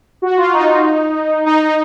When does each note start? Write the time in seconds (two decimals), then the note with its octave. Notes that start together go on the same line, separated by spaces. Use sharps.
0.22 F#4
0.37 F4
0.53 D#4
1.46 D#4
1.62 D#4